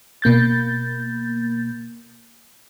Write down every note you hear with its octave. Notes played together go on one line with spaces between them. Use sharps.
B2 A#3 G6 A6